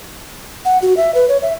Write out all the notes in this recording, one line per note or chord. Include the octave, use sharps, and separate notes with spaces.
F#5
F#4
E5
B4
C#5
E5